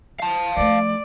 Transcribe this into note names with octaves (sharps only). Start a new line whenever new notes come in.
F5 A5
F3 A3 D5